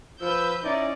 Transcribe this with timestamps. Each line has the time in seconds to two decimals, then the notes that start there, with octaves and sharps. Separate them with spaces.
0.21 F3 B4 E6 G6
0.65 C#4 D#4 E4 D5